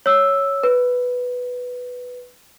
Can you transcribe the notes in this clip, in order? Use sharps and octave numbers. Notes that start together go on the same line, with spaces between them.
C#5 E6
B4